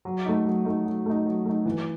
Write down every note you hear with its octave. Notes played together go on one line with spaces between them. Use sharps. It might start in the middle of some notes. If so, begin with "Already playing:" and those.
F#3
A3 D#4
F#3
A3 D#4
F#3
A3 D#4
F#3
A3 D#4
E3